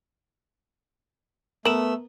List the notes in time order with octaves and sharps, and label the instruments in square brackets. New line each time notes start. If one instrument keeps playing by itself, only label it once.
[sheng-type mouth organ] A3 E6 [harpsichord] B3 [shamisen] A#4 [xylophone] E7 F#7